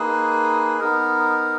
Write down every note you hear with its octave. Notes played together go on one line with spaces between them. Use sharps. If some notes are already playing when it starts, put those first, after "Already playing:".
Already playing: A#3 D#4 G#4 B4
B3 D#4 A#4